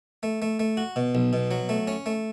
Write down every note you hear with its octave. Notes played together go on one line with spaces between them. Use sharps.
A3
A3
A3
F#4
B2
B1
B2
F#3
A3
C#4
A3